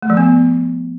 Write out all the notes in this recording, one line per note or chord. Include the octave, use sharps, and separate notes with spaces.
A3
F3
B3